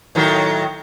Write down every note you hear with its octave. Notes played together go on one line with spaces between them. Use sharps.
A2 D#3 F#3